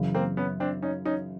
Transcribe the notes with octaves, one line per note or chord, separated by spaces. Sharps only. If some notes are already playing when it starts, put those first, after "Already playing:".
Already playing: F#2 C#3 E3
A#3 C4
B3 C#4
C4 D4
C#4 D#4
C#4 D#4